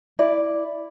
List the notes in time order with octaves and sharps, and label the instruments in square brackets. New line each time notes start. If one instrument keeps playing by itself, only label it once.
[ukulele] E4 D5